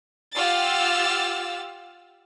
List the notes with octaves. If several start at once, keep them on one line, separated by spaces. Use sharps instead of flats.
F4 G4 F#5 E6 F6 A6